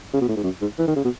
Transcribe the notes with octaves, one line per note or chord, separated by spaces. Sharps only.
C#3
B2
A2
G#2
F#2
G#2
E3
D#3
C#3
B2